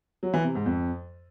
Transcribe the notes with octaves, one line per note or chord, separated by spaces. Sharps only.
F#3
E3
C3
G#2
F2